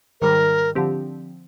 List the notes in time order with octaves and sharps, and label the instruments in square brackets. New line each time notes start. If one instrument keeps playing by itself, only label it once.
[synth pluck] G#2 D#3 G3 [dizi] A#4
[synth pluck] D3 F3 C4 G4